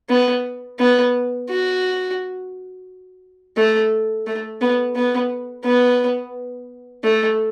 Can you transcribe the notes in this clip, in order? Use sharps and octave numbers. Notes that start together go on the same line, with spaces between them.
B3
B3
F#4
A3
A3
B3
B3
B3
A3